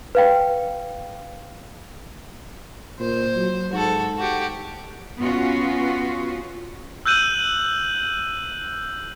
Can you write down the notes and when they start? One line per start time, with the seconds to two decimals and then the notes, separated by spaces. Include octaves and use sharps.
0.15 B4 F5 G5
3.00 A#2 C5
3.37 F#3
3.73 G#2 F#4 A4
4.18 F#4 G4
5.19 B3 C#4 F4 F#4
7.06 E6 F#6 G6 D#7 F#7